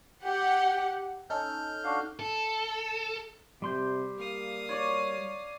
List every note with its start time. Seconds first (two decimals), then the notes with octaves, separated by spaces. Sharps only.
0.22 G4 F#5
1.30 C#4 D#4 A4 F6 G6
1.84 D4 F#4 F5
2.19 A4
3.62 C3 G3 C6 G6
4.18 A#3 F5 D#6
4.69 C#5 D5